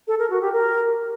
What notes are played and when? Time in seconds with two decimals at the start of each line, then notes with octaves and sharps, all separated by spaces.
0.08 A4
0.19 A#4
0.30 F#4
0.41 G4
0.53 A#4